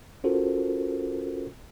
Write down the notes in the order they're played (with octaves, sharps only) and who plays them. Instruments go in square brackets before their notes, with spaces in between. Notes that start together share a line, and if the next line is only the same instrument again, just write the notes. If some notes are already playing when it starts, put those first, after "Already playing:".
[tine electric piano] C#4 F4 F#4 A4 A#4 C5